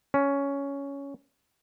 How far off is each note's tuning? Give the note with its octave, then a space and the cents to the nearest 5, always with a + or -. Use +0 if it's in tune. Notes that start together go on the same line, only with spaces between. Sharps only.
C#4 +10